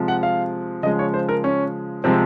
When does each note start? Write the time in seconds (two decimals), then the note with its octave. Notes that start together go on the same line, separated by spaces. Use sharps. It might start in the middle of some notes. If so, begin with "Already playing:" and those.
Already playing: C3 F3 G#3
0.08 F#5
0.23 F5
0.83 C#3 F3 G#3 D#5
0.99 C#5
1.14 C5
1.29 A#4
1.44 C#4
2.04 C3 F3 G#3 C4